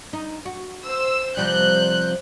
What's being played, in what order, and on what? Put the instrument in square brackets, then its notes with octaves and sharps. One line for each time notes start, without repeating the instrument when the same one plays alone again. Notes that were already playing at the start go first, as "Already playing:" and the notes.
[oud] D#4
F#4
[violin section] C5 E6
[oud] C3 F3 G3 [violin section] F#6 G6